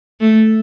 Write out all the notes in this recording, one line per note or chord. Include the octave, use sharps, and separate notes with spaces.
A3